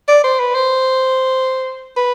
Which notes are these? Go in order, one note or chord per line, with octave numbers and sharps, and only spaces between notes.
D5
C5
B4
C5
B4